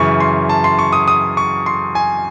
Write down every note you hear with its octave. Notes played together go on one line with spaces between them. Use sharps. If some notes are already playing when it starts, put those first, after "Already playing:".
Already playing: F#2 C#3 E3 C#6
C6
A5
C6
C#6
D#6
D#6
C#6
C6
G#5